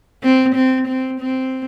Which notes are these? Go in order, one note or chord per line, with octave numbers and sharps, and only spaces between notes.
C4
C4
C4
C4